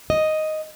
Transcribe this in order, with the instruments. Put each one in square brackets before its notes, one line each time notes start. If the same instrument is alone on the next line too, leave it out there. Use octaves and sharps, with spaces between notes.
[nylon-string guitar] D#5